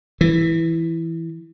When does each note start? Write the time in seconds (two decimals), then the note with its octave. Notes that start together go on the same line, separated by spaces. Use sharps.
0.21 E3